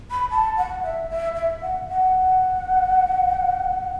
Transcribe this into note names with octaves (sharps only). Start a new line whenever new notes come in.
B5
A5
F#5
E5
E5
E5
F#5
F#5